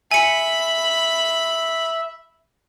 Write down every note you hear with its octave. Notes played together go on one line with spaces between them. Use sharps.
E5 G#5 B5 C#7